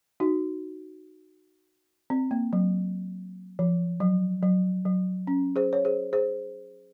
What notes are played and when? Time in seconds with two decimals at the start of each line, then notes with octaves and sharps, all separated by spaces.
0.20 D#4 F#4
2.10 C4
2.31 A#3
2.53 F#3
3.59 F3
4.00 F#3
4.43 F#3
4.85 F#3
5.27 C#4
5.56 G#4 C5
5.73 C#5
5.85 G#4 C5
6.13 G#4 C5